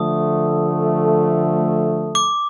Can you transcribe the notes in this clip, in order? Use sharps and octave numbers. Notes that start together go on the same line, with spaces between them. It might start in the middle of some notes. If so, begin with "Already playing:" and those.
Already playing: D3 F3 A3 D#6
D6